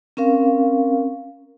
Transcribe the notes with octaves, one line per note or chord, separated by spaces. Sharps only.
C4 C#4 A#4 F5